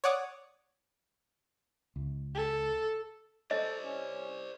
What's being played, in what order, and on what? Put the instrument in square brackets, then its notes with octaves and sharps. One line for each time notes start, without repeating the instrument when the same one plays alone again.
[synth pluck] C#5 D5 F#5 D6 D#6
[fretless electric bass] C#2
[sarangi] A4
[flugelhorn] A4 [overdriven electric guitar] C5 D5 [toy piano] D#5
[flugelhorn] C#4